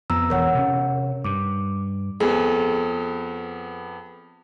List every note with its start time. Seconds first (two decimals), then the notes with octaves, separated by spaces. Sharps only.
0.10 F2 B3 A#5 E6
0.30 E1 E2 A#4 C#5 F#5
0.55 C3 C#4
1.24 G2 D6
2.20 F2 B3 G#4 A4